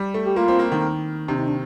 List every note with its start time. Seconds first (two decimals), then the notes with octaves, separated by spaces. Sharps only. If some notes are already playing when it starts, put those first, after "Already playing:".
Already playing: G3
0.14 A3
0.26 G4
0.36 A#3 F4
0.48 C4
0.59 A#3
0.72 D#3
1.28 C3 D4
1.37 D#4
1.47 D4